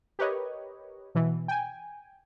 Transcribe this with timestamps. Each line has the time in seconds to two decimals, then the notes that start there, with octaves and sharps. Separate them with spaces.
0.19 G4 A#4 B4 C#5 D#5
1.15 B2 E3
1.48 G5 G#5